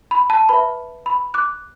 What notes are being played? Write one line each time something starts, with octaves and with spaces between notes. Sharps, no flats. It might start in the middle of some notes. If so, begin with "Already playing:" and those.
B5
A5
B4 E5 B5
B5
D6 F#6